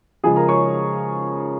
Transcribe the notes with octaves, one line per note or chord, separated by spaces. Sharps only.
C#3 F3 G#3 C#4 G#4 G#5
A#4 A#5
C#5 C#6